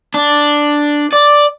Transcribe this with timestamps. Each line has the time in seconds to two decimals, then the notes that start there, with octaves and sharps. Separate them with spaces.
0.14 D4
1.13 D5